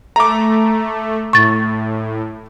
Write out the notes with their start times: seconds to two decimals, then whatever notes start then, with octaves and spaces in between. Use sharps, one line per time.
0.16 A3 A#5 D6
1.33 A2 C#6 A6